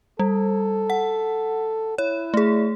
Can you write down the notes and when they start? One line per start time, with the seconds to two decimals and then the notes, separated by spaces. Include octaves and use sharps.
0.19 G3 A4
0.90 F#5
1.98 E4 C#5
2.34 A3 G#4